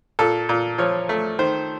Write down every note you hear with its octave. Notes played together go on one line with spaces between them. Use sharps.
A#2 A4
A#2
F3 C#5
A3
D#3 C5